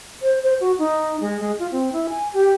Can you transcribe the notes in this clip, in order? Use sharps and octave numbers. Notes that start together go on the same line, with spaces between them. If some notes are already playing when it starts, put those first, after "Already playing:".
C5
C5
F#4
D#4
G#3
G#3
F4
C4
E4
G#5
G4